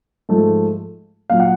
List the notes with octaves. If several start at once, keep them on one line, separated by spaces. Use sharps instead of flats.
G#2 F3 A3
A#2 F#3 F5
F#5